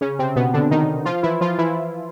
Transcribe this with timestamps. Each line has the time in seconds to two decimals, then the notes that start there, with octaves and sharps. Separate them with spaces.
0.01 C#3 C#4
0.19 C3 C4
0.36 B2 B3
0.53 D3 D4
0.71 D#3 D#4
1.05 F3 F4
1.23 E3 E4
1.41 F3 F4
1.58 E3 E4